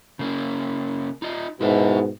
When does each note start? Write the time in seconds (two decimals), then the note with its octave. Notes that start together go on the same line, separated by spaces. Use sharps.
0.19 C#3 A#3 C#4
1.22 D#4 F4 D#5
1.61 G#2 B2 E4 A#4 E5